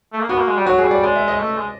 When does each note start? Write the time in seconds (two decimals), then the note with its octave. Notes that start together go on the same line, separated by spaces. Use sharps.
0.13 A3
0.21 A#3
0.29 B3 F#4
0.39 A#3
0.48 G#3
0.57 G3
0.66 F#3 F#4
0.78 G#4
0.85 G3
0.91 D5
1.03 G#3 D5
1.15 E5
1.28 D#5
1.40 A3
1.58 G#3